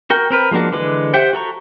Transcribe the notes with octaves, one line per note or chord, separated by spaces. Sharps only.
F#4 A#4 G5
C4 A#4 B4
F3 G#3 A#3 D4 F#4
D3 E3 G#3 B4 D6
G4 C5 E5 F#5 G5
F#4 A4 A#5 C#6